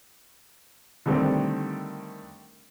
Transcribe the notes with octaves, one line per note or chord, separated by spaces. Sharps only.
D3 D#3 G3 A3 C4